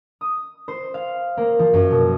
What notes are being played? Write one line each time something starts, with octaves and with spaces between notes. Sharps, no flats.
D#6
C5
F5
A#3
F3
F#2
B2